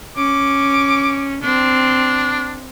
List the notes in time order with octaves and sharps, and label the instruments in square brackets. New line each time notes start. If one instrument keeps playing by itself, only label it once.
[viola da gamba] C#4 [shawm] D6
[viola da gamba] C4 [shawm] D4